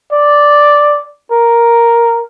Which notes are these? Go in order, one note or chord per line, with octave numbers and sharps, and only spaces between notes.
D5
A#4